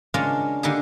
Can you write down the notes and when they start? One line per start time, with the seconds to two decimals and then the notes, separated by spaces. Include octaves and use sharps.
0.14 C#3 G#3 A#3 C#4 D4 F4
0.63 D3 A#3 D#4 G4 G#4